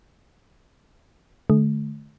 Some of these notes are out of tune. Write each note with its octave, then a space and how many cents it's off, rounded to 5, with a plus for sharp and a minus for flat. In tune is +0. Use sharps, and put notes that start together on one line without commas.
D3 +15 A3 -35